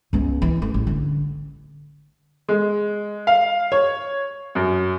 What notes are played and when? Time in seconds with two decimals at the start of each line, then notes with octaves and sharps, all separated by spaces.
0.13 C#2 B3
0.42 E3
0.62 A3
0.74 A1
0.87 D3
2.49 G#3
3.27 F5
3.72 C#5
4.55 F#2